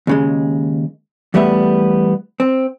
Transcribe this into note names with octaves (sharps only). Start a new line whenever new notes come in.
D#2 C#3 G#3
E2 G3 A3 B3 E5
C4